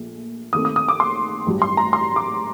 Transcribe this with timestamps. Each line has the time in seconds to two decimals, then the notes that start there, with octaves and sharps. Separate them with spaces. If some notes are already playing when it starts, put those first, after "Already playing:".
Already playing: A#1 A#2 A3
0.53 D#2 D#3 A3 C4 D#6
0.65 D#6
0.76 D#6
0.88 D6
1.00 C6
1.46 A1 G2 F#3
1.62 C6
1.77 A#5
1.93 C6
2.16 D6